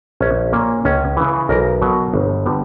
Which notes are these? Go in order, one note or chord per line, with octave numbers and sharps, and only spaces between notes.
A#1 C#4
A#2 A#3 C#4
C#2 C#4
C#3 E3
B1 A#4
B2 F#3
G1
D3 G3 B3